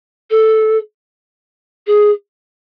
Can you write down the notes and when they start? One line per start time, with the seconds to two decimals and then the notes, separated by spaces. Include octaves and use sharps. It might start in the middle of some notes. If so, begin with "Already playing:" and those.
0.30 A4
1.87 G#4